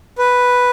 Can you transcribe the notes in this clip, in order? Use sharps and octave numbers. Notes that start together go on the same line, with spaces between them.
B4